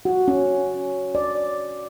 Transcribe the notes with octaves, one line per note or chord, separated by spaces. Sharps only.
F#4
C#4
D5